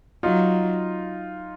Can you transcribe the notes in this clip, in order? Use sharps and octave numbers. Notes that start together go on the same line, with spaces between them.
F#3 D#4 F4